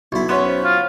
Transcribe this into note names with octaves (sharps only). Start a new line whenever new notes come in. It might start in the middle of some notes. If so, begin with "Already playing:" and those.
B1 B3 E4
B3 C#4 C6
C5
F4